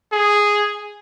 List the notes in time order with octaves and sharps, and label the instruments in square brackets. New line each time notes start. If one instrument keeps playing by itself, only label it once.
[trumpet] G#4